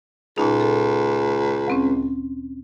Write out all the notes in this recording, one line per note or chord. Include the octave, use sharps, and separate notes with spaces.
C#2 A#2 D#4
A4
D2 C4 C#4